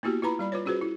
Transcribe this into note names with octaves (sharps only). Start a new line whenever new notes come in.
A#3 B3 E4 F#4 G4
E4 F4 B4 A#5 B5
G3 D5 B5
F4 B4 C#5
C#4 F4 F#4 G#4 B4 C5
E4